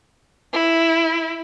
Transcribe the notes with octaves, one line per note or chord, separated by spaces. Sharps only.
E4